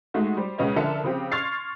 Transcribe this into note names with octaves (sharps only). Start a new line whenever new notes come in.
G#3 A3 D#4 F#4
G3 C5
C#2 C#3 B3 C#4 D#5
D3 F3 A#4 E5 A5 C#7
C#3 F3 C4 G4
C6 C#6 F6 G#6 A6 C7